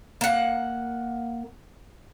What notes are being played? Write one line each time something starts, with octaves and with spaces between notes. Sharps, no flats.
A#3 F#5